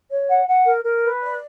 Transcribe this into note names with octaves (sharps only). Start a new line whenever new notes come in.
C#5
F#5
F#5
A#4
A#4
B4
D5